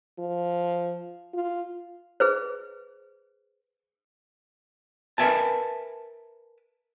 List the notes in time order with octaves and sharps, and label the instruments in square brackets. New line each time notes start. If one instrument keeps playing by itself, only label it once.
[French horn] F3
F4
[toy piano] G#4 B4 C5
[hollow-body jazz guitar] A#4 B4 D5 E5 G#5 A5